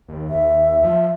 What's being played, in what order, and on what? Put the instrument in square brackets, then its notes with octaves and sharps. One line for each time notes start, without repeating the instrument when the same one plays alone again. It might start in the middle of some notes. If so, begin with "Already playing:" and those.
[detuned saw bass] D#2
[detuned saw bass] D#2 [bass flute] E5
[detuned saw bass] F3